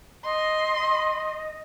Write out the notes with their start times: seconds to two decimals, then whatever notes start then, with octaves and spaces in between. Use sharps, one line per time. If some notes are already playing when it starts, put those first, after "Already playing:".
0.24 D#5 C6